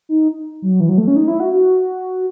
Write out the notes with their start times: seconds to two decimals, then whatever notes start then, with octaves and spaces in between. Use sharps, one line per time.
0.09 D#4
0.62 F#3
0.80 E3
0.89 F#3
0.98 A3
1.08 C#4
1.16 D#4
1.28 E4
1.40 F#4
1.52 F#4